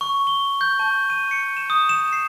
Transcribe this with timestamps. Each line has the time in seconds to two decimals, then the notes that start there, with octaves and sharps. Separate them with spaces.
0.01 C#6
0.27 G7
0.61 G6
0.79 A5
1.10 D#7
1.31 C#7
1.57 E7
1.70 D#6
1.89 E7
2.13 C7